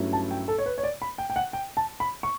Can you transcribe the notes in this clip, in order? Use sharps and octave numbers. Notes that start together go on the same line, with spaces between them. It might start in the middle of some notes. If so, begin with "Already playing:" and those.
Already playing: G2 F#3 A3 C#4 E4
A5
G5
A4
C#5
B4
C#5
D5
B5
G5
G5
F#5
G5
A5
B5
C#6